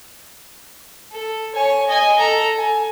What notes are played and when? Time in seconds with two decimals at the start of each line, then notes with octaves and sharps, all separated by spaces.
1.12 A4
1.55 C#5 G#5
1.87 D#5 G#5
2.19 A4 A#5
2.58 G#5